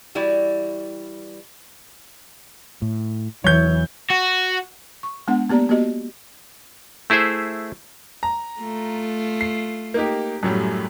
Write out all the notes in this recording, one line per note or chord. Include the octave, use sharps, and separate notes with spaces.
E3 G3 E4 F#4 D5
A2
E2 E3 F#3 C#5 G6
F#4
C#6
G#3 B3 D4 F#5
A#3 B3 G4 D5 A#5
A#3 B3 F#4 G4 D#5
A3 E4 G#4 C5 E5
A#5
A3 F4
C7
A#3 D#4 G4
F#2 A2 F#3 G3